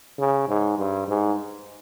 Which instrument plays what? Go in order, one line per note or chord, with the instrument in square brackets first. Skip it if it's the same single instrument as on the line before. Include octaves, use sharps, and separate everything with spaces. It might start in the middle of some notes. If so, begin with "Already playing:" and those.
[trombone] C#3
G#2
G2
G#2